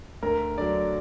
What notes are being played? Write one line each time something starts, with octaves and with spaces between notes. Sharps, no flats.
D2 A#4
D3 F#3 D5